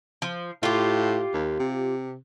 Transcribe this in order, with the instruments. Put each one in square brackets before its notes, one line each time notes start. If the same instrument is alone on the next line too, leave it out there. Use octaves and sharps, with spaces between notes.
[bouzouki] F3
[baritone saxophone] A2 [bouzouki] F4 G4
[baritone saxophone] D#2
C3